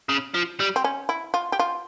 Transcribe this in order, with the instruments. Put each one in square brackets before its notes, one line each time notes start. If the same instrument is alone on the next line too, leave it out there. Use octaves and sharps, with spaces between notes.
[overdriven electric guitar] C#3
F3
G3
[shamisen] C4
C#4
E4
F4
G4
F4